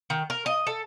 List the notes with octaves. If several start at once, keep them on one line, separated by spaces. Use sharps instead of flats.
D#3
A#4
D#5
A4